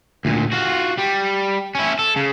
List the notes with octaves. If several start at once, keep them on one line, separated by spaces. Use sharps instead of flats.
D2 A#2
F4 F#4
G3
C#4 E4
A4
C#3